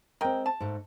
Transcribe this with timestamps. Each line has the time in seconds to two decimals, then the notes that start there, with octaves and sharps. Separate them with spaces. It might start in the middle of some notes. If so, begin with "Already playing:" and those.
0.21 G#3 C4 A#4 D#5 G5
0.46 A5
0.60 G#2 A3